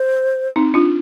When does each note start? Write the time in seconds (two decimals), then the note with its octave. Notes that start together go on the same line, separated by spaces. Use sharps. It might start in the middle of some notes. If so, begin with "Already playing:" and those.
Already playing: C5
0.56 C4 D#4
0.74 D4 F4